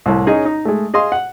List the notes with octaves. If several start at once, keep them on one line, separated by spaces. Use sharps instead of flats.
C2 A2
C#4 D#4 G#4 C#5 D#5
D#4
G#3 A3
G#4 D#5 F5 C6
F#5